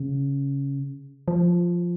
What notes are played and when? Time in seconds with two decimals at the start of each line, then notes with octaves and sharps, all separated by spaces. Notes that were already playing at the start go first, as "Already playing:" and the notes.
Already playing: C#3
1.28 F3